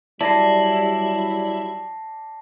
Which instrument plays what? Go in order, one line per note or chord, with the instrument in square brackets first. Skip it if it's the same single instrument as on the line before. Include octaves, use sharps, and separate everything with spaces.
[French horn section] E3 F#3 G3 [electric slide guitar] E4 [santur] D5 [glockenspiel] A5 A#6 C7